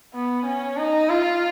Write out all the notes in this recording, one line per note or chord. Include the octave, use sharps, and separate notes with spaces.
B3
C#4
D#4
F4